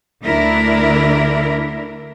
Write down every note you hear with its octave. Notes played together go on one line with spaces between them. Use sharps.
D2 D3 D4 E4 A#4